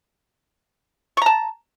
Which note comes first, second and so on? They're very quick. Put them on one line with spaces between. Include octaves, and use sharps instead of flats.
C#6 A#5 A5